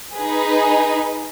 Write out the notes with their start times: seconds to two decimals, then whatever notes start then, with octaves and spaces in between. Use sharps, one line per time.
0.16 D#4 G#4 B4